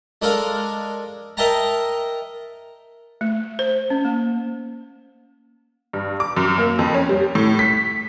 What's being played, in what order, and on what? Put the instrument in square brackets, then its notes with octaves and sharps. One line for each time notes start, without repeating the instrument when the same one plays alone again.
[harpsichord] G#3 D4 A4 A#4 F5
A#4 D#5 E5 G5 A5 A#5
[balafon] A3
C5
C#4
A#3
[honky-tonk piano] G2
D6
F#2
A#3
F2
C#4
G3
A2
B6